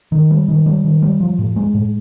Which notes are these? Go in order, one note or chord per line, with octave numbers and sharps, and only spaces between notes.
D#3
G3
D#3
G3
D#3
G3
F3
A2
G#3
A2